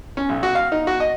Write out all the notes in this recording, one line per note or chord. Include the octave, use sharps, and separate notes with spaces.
C#4
B1
F#4
F5
D#4
F#4
D#5